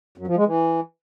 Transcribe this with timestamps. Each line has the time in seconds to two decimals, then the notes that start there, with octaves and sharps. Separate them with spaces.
0.18 F#2
0.27 F3
0.37 G#3
0.46 E3